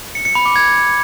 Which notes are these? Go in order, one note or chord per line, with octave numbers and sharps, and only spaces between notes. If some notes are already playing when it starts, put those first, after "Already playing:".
C#7
C#7
B5
D6
G#6